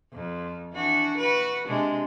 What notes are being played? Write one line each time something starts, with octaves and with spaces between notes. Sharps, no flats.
F2
E3 D4 F#4
F#4 B4
C3 G#3 D4